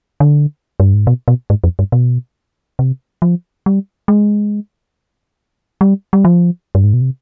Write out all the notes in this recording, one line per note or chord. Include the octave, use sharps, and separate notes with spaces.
D3
G2
G#2
B2
B2
G#2
F2
G2
B2
C3
F3
G3
G#3
G3
G3
F3
G2
G#2
B2
C3